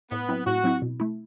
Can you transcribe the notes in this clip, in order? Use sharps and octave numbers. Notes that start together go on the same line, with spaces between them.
A2 B3
F#3 C4 E4
A2 F#4
F#3 C4 E4
B2
A3 E4